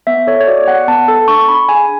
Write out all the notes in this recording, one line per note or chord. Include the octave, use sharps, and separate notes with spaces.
B3 E5
A4 C#5
C#5
F#4 D5
B3 F#5
B3 A5
A4 A5
D4 C#6
D4 B5
G#4 G#5